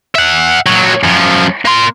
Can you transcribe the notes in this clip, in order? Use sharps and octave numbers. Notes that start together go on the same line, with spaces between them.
E5 F#5
A#2 F#3
F#2 F3
A#3 C6